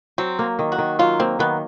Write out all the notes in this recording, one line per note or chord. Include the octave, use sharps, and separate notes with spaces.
F#3 C4
A#3
D#3
F#4
D#3
F#3 F4
A#3 C4
D#3 B3